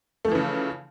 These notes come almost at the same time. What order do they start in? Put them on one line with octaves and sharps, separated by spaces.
A3 F3 E3 C#3